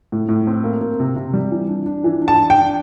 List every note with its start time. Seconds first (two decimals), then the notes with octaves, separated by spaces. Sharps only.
0.12 A2
0.29 A2
0.47 C4
0.64 A#3
0.81 A#3
1.00 C3
1.16 C3
1.33 G3
1.52 E3
1.69 D4
1.86 D4
2.04 E3
2.22 D4
2.28 A5
2.39 D4
2.50 G5
2.56 D4